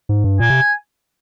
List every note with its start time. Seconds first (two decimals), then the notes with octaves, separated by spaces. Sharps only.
0.09 G#2
0.24 G2
0.40 A#2 G#5
0.50 C3